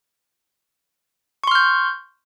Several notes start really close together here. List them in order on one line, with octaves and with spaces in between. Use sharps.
C#6 C6 F6 G6